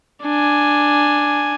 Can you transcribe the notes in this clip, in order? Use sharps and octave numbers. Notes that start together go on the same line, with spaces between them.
D4 G#5